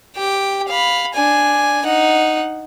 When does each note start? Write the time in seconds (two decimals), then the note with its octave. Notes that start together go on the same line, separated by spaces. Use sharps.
0.16 G4 G5
0.68 F5 B5
1.14 D4 G#5
1.84 D#4 F#5